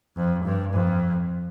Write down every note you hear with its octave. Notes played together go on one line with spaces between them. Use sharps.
F2
G2
F2